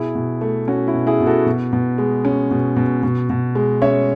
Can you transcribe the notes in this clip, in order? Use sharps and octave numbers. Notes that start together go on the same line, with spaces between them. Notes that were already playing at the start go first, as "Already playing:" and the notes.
Already playing: B2 E4 G#4
B2
A3
C#4 F#4
E4
B2
E4 G#4
B2
F#4 A4
B2
B2
G#3
C#4
B2
B2
B2
B2
G#3
C#4 C#5 E5